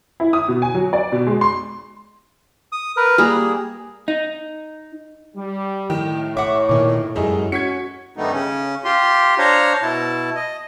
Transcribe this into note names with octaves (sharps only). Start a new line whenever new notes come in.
E4
D#6
B2
G#5
F#3
D5
B2
G#3
C6
D#6
A#4 B4
G3 A#3 G#4 A#4
D#4
G3
A2 D#3 G5
C#5 E5 F#5 D6
A#2 D#3
F#2 G3 G#3 D#4 E4 G#4
C#4 F#4 G#6 B6 C#7
G2 D#3 G3 A3 B3 D#4
C#3 C#4
F4 G4 C6
D4 C5 C#5 F5 A#5
B2 E4 A5
D#5